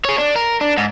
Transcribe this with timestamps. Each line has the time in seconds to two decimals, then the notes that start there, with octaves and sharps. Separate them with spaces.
0.05 G#4 C#5
0.18 D4
0.36 A#4
0.61 D4
0.78 G#2